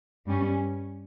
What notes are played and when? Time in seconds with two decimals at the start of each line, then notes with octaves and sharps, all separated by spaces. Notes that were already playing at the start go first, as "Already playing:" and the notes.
0.25 G2 G3 C#4